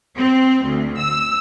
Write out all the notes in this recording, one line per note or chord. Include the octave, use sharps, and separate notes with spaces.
C4
D2
E6